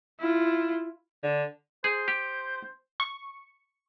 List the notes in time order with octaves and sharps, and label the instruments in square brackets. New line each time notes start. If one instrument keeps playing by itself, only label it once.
[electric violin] E4 F4
[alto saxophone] D3
[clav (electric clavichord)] G#4 [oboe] C5
[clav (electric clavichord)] G4
[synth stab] C#6